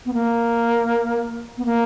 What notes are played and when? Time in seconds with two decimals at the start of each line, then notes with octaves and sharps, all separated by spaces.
0.06 B3
0.14 A#3
1.58 B3
1.65 A#3